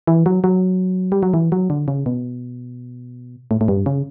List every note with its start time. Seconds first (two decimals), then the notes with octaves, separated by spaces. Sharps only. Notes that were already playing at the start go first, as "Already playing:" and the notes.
0.07 E3
0.26 F#3
0.44 F#3
1.12 G3
1.23 F#3
1.34 E3
1.52 F#3
1.70 D3
1.88 C#3
2.06 B2
3.51 A2
3.61 A2
3.68 G2
3.86 C#3